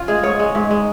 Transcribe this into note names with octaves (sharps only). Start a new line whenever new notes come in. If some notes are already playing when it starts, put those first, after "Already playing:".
Already playing: C#4 F4
G#3 G#4
G#2 C#5
G#3
G#2
G#3